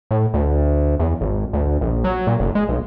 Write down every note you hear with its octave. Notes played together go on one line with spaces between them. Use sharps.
A2
D2
E2
G#1
D2
A#1
F#3
A#2
F#1
G#3
B1